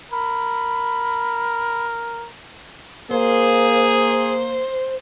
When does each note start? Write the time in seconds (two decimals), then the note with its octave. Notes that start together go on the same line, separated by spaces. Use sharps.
0.12 A#4 B5
3.11 A#3 G#4 C5